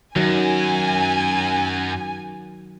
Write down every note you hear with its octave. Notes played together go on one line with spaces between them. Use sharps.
F#2 D#3 F#3 G#5